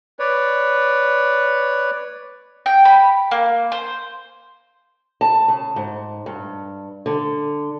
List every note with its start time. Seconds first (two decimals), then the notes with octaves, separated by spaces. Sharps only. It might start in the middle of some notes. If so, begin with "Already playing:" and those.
0.19 B4 C#5 D5
2.66 G5
2.85 B5
3.31 A#3
3.72 C5
5.21 A5
5.48 C#3
5.76 G#2
6.26 G2
7.06 D3